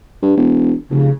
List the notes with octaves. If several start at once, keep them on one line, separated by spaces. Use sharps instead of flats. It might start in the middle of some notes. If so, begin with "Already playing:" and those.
G2
E1
F1 C#3